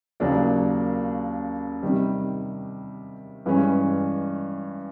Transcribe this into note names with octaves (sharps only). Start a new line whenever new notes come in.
D#2 C#3 F#3 A#3 D4
C3 D#3 G3
G2 E3 G#3 C#4